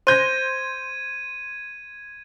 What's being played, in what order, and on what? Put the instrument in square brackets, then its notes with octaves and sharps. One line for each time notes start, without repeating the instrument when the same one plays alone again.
[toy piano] C5 [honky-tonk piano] C6 G6 A#6 [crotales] G#6 D#7